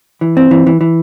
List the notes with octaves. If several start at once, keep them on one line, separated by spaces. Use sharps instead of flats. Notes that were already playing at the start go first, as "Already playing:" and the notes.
E3
C4
E3
E3
E3